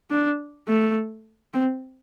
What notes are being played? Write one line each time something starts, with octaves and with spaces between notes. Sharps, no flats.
D4
A3
C4